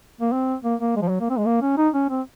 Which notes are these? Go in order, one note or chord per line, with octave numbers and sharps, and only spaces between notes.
A#3
C4
A#3
A#3
G#3
F3
F#3
A#3
C4
G#3
A#3
C#4
D#4
C#4
C4